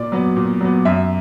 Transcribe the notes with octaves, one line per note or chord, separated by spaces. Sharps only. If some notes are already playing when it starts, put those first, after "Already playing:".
Already playing: A#2 D5
F#3 B3
A#2
F#3 B3
F#2 E5